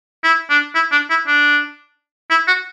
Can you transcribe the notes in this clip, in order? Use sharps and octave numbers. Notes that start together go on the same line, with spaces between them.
E4
D4
E4
D4
E4
D4
E4
F#4